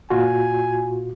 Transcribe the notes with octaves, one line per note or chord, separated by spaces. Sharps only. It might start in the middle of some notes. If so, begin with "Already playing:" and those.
A#2 F4 F#4 G#5